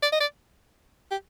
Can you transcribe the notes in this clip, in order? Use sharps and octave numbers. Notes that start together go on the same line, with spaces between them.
D5
D#5
D5
G4